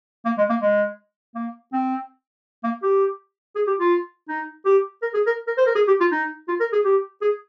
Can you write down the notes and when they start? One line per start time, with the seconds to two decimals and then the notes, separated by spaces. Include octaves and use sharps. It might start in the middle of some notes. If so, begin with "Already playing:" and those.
0.25 A#3
0.38 G#3
0.50 A#3
0.62 G#3
1.35 A#3
1.73 C4
2.64 A#3
2.83 G4
3.55 G#4
3.67 G4
3.80 F4
4.29 D#4
4.66 G4
5.02 A#4
5.14 G#4
5.26 A#4
5.47 A#4
5.57 C5
5.66 A#4
5.75 G#4
5.88 G4
6.00 F4
6.12 D#4
6.48 F4
6.60 A#4
6.73 G#4
6.85 G4
7.22 G#4